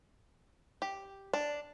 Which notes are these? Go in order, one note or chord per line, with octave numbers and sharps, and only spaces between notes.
G4
D4